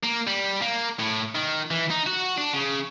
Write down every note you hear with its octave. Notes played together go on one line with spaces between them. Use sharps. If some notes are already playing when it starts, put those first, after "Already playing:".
A#3
G3
A#3
A2
D#3
E3
D#4
F#4
D4
C#3